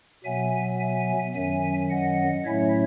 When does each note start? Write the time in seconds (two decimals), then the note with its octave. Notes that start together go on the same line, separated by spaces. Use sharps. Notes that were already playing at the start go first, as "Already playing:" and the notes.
0.24 B2 F#3 B3 E5 G#5
0.80 E5 G#5
1.35 F#2 D#3 F#3 E5 G#5
1.90 D#5 F#5
2.45 A2 F#3 A3 C#4 E4 C#5 E5